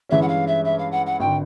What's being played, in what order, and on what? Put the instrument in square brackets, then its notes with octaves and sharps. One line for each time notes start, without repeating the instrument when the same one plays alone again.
[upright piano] G2 E3 G#3 C#4 [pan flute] E5
[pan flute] F#5
F5
E5
E5
F5
F#5
F#5
[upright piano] G#1 D3 [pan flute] G5